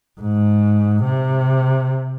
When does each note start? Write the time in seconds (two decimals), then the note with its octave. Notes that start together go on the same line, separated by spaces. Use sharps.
0.21 G#2
1.04 C3